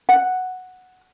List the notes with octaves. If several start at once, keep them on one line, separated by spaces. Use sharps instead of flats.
F#5